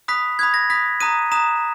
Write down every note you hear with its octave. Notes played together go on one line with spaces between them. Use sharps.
B5 D#6 F#6 B6
B5 D#6 F#6 G#6
A#6
B5 D#6 F#6 B6
A#5 D#6 F#6 D#7
A#5 D#6 F#6 E7